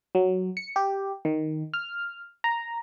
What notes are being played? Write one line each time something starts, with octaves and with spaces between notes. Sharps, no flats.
F#3
C#7
G4
D#3
F6
A#5